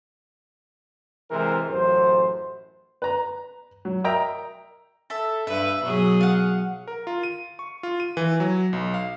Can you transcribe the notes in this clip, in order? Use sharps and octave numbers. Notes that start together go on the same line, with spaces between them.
C3 E3 G#3 A#4 C5
A1 F#2 C5
B4 A#5
F#3
A#4 D#5 E5 G5 A#5
A4 E5
G2 B4 E5
B2 F#3 G#4
F5 F#5
A#4
F4
D#7
C#6
F4
D#7
E3
F#3
B1
F5